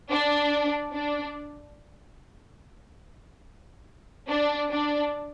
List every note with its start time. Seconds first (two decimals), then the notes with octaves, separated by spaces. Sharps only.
0.10 D4
0.93 D4
4.28 D4
4.70 D4